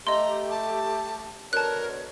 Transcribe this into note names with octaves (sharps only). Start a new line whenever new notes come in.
A3 G4 D#5 A#5 C6
A5
B2 D3 A#4 C#5 A5 F#6